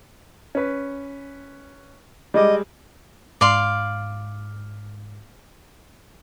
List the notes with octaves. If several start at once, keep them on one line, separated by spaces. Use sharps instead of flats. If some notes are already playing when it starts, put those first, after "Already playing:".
C#4 B4
G3 G#3 D#5 D6
G#2 D5 F5 C6